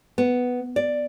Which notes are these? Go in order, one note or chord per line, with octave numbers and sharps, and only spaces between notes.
B3
D5